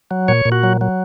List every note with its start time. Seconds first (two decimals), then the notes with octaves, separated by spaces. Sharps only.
0.11 F#3
0.28 A#2 C#5
0.46 A#2
0.52 F#4
0.63 F#3
0.81 F#3